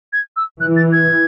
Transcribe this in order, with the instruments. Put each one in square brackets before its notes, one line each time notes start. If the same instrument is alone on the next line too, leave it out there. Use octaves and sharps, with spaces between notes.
[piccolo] G#6
E6
[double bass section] E3 [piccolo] F#6
[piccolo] A6
G#6